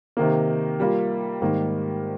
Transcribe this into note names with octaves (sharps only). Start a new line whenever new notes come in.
C3 D#3 A#3
G3 A#3 F4
G#2 D#3 G3 A#3